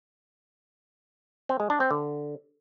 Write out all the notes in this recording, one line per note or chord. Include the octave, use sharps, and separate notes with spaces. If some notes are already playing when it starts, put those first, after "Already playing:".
C4
G#3
D4
C4
D3